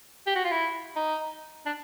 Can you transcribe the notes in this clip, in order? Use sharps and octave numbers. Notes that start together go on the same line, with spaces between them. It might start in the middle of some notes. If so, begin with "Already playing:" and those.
G4
F#4
F4
E4
D#4
D4